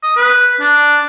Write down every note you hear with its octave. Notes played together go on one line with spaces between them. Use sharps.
D#6
B4
D4